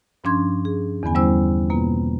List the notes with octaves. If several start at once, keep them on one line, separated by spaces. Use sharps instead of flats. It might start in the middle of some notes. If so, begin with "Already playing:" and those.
G2 F3 C#4 D4 C6 G#6
G#4
E2 D3 E3 B3 G#5
G3 B3 C#4 E4 C5 E6
B2 A#3 B3 F4